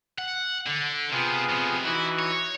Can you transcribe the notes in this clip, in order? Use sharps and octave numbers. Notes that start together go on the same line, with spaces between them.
F#5
D3
C3 B3 F4 G#4
F2 C3
E3 D#4 E4 F#4
C#5